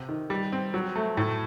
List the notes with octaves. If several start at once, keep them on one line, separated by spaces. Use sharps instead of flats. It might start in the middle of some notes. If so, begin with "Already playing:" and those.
Already playing: C3
D#3
G3
C4
F#3
A3
A2